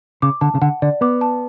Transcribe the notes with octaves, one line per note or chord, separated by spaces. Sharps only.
C#3 D6
D3 A5
C#3
D3 F#5
D3 D5
B3 D6
A5